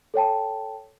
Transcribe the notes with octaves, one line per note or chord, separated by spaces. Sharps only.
A4 C#5 G5 A5